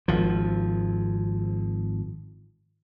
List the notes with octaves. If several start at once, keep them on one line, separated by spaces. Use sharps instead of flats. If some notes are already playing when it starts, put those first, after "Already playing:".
G#1 F3